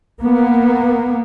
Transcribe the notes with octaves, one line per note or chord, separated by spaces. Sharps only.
A#3 B3